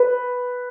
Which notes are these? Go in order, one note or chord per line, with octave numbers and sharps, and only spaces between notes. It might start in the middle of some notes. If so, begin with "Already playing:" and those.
Already playing: B4